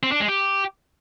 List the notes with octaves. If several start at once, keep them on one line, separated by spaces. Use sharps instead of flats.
C4
D4
G#3
G4